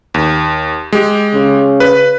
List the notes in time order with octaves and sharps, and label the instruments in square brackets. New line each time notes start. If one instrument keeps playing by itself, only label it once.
[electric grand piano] D#2
G#3 G4
[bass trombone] C#3
[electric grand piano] B4